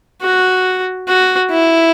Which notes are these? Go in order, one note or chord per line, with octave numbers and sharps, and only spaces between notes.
F#4
F#4
E4